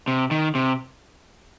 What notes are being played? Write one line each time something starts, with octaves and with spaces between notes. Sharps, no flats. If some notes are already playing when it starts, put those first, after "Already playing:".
C3
D#3
C3